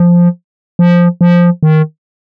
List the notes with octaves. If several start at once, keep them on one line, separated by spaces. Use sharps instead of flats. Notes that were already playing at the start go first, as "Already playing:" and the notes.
Already playing: F3
F3
F3
D#3